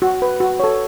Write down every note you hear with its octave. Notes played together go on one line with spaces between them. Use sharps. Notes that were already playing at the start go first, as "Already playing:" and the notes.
F#4
B4
F#4
A4 C#5